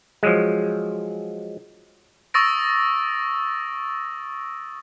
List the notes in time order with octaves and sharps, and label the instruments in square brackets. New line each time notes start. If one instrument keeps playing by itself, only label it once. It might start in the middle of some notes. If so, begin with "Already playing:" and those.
[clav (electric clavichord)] F3 F#3 G#3
[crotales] C#6 D#6 E6 A6 A#6 D7